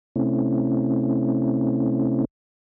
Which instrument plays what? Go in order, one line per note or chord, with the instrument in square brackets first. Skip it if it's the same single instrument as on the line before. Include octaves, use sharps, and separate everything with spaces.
[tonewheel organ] C3 A3 C4 C#4 E4